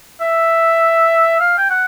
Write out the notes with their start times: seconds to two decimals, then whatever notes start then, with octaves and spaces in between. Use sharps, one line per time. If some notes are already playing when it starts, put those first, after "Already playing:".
0.21 E5
1.40 F5
1.58 G5
1.70 F#5